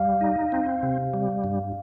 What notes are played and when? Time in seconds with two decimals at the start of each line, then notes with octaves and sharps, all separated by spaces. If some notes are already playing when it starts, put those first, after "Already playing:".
Already playing: G3 F5
0.21 D#4
0.52 C4
0.83 C3
1.14 G3
1.44 G2